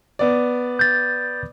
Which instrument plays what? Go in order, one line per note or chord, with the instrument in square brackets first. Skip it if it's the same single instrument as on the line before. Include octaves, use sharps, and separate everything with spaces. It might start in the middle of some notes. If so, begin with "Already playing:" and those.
[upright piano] B3 D5
[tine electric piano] G6 A6